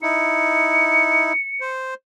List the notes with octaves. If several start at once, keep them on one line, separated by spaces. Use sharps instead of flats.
D#4 E4 C#7
C5